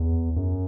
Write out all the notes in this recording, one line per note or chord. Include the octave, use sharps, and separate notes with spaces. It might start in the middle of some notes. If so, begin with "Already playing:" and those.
Already playing: E2
F#2